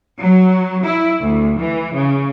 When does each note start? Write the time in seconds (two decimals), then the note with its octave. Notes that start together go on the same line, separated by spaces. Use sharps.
0.19 F#3
0.84 E4
1.22 D2
1.59 E3
1.96 C#3